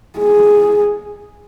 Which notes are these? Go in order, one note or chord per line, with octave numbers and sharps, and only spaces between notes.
G#4